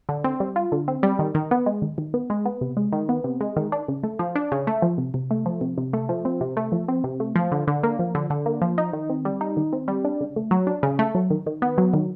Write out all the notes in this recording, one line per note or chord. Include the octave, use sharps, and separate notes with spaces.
D3
C4
G3
F4
D3
C4
G3
D#3
D#3
B3
G#3
D#3
D#3
B3
G#3
B3
C3
G#3
D#3
B3
C3
G#3
D#3
D4
C#3
A3
F3
D4
C#3
A3
F3
C3
C3
A3
F3
C3
C3
A3
F3
C4
C3
A3
F3
C4
C3
A3
F3
D3
D3
A#3
F3
D3
D3
A#3
F3
D#4
D#3
C4
G3
D#4
D#3
C4
G3
D4
C#3
A3
F#3
D4
C#3
A3
F#3
D#3
D#3
B3
F#3
D#3